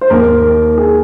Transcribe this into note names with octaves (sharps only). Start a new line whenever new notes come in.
C5
D#2 D#3 A#3 A#4
G#4